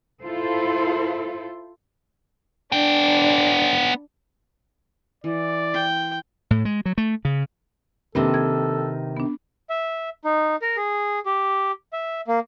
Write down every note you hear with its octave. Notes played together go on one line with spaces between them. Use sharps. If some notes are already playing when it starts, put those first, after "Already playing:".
E4 F4 A4 C5
B3 D4 G5
E3 D5
C5 G5
A2
G#3
F#3
A3
C#3
C3 D#3 A#3 C4 D4 A4 B4
G#6
B3 D4
E5
D#4
A#4
G#4
G4
E5
A#3